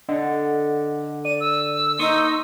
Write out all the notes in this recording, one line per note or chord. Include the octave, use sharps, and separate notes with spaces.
D3 A4 D#5 F#5
D5 D#7
E6
A#3 D#4 C6 C#6 D#6